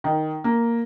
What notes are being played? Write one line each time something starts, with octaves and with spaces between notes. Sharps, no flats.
D#3
A#3